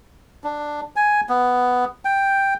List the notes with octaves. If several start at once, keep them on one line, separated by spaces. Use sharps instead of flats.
D4
G#5
B3
G5